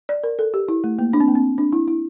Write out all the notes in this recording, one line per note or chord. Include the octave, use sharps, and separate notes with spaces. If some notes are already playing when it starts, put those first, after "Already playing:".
D5
A#4
A4
G4
E4
A3
A#3
D4
C4
A#3
C4
D4
E4
E4